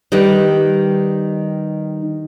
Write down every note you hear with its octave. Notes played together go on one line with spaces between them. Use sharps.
D#3 G3 B4